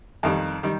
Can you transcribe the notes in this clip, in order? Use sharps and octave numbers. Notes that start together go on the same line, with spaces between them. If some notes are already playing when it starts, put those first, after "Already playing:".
F2 D#3 G3
D#3 G3